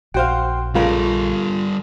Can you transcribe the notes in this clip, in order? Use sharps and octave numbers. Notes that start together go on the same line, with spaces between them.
A#1 F#4 C5 F5 G5 C6
C#3 G3 F4 A4 A#4